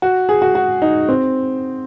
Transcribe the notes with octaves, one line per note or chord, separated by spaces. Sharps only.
F#4
G#4
F#4
F#4
D#4
C4